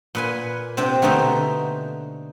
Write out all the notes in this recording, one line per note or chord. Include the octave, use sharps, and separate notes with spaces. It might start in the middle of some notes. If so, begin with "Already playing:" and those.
A#2 B4 G#5
C3 C4 D4 G5
B2 D3 A3 D#4 C5 G5